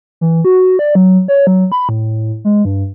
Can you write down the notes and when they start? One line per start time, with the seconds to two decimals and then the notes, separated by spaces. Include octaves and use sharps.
0.21 E3
0.45 F#4
0.79 D5
0.95 F#3
1.28 C#5
1.47 F#3
1.72 B5
1.89 A2
2.45 G#3
2.65 G2